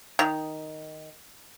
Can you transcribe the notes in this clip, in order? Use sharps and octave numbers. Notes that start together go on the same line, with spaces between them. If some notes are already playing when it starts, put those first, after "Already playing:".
D#3